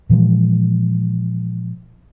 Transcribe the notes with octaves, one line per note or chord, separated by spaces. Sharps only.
A#2 E3 F3 G#3